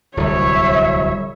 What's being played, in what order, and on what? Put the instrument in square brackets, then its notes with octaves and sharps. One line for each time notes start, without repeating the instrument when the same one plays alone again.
[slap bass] D1 C2 [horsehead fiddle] C#5 E5